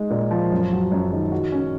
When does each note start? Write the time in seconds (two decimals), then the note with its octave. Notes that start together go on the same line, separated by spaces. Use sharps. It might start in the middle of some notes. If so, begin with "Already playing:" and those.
Already playing: G#3 D#4
0.10 A#2
0.31 F3
0.51 F#2
0.72 F#3
0.92 F#2
1.11 D#3
1.32 F#4
1.52 C#4